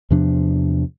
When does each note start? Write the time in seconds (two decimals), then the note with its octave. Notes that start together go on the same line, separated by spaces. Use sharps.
0.10 E2 C3 F3 D4